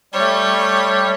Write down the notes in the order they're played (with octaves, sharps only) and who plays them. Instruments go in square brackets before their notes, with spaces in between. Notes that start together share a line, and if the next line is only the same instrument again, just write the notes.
[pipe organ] G3 [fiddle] A3 C#5